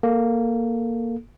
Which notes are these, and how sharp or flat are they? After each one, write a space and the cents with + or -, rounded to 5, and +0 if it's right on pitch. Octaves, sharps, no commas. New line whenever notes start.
A#3 +0 A4 -5